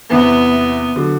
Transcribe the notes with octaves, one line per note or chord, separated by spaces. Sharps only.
E2 C3 E3 B3
D3 F#3